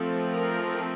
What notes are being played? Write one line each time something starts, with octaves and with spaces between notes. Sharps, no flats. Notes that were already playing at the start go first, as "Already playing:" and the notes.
Already playing: F3 A3 C4 A4
A#4